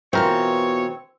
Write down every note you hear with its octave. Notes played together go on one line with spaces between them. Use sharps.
B2 E3 C4 F4 A#4 C#5